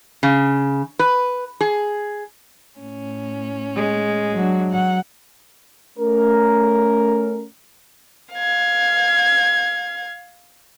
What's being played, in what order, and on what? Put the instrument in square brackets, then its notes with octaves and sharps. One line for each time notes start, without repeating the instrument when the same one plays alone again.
[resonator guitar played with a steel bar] C#3
B4
G#4
[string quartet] A2 C#4
[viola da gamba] G#3
[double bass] F#3 [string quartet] D4 F#4
[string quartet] F#5
[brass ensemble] A3 C#4 A#4
[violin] F5 G#6